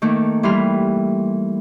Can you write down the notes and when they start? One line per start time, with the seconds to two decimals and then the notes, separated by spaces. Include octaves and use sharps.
0.02 D#3 A3 A#3
0.43 E3 G3 C6 F6